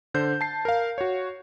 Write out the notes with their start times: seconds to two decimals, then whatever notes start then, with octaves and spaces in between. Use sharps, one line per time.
0.14 D3 C5 G6
0.41 A5 C7
0.65 A#4 F5
0.98 F#4 C#5